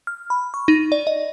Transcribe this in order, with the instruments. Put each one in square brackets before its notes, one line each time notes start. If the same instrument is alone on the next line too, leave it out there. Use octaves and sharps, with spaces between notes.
[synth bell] F6
B5
C#6
D#4
D5
D#5